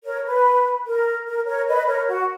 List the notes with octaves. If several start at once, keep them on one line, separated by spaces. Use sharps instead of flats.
A#4 C#5
B4
A#4
A#4
A#4 C#5
B4 D#5
A#4 C#5
F#4